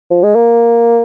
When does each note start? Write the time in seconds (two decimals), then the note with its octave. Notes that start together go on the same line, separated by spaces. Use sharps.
0.11 F3
0.23 G#3
0.35 A#3